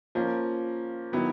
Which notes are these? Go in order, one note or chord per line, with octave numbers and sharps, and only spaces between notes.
F3 A#3 C#4
D#3 F#3 B3 E4